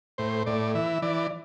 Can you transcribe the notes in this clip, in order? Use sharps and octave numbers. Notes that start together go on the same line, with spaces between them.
A2 C5
A2 D5
E3 E5
E3 D5